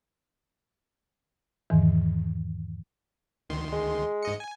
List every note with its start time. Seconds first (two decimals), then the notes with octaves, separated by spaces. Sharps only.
1.70 E2 G#2 D#3 E3
3.50 D2 D#3 C6
3.72 G#3
4.23 G#2 D#5 C#7
4.40 G#5